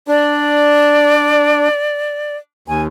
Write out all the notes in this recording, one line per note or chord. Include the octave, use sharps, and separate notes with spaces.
D4 D5
D#2 G#5